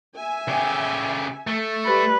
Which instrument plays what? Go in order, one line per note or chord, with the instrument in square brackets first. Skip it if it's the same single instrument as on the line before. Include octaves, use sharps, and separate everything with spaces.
[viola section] E5 G#5
[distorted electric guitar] C#3 G4
A3
[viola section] G3 [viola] B4